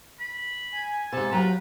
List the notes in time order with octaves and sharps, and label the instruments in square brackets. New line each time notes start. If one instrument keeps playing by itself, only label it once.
[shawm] B5
[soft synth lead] G#5
[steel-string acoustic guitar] G#2 C3 [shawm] A4
[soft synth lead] F#3 [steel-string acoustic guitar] F4 G5 A#5 [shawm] B4